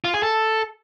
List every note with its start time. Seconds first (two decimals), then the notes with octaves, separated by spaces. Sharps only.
0.05 F4
0.14 G#4
0.23 A4